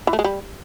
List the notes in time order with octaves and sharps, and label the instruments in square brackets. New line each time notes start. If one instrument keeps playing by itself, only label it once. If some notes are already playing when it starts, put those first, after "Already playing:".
[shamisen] E3
A3
G#3
G3